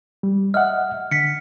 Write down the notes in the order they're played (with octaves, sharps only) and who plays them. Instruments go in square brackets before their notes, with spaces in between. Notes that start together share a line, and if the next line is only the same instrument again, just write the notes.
[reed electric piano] G3
[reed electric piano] D#5 E5 F#5 [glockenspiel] F6
[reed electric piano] D3 [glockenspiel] B6 C#7